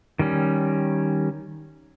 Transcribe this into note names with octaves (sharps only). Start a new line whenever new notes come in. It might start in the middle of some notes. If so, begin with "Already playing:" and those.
D#3 G3 C#4